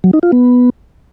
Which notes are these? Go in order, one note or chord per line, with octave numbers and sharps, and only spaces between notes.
F#3
D#4
F4
B3